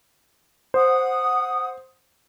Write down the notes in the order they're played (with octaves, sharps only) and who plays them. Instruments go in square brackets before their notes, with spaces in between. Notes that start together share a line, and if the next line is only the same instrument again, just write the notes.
[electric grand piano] C5 [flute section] F#5 D#6